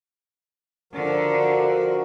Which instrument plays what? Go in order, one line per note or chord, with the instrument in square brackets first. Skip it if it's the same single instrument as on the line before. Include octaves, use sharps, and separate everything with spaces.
[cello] D3 [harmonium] F3 F#4 A#4